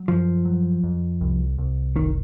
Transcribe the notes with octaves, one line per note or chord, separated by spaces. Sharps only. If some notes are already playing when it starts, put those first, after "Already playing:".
Already playing: F#3
F#2 F3
F#3
F2
C2
C2
F#1 D#3